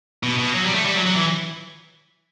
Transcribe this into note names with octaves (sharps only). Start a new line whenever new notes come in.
B2
B2
F#3
G3
A3
G3
F#3
F#3
E3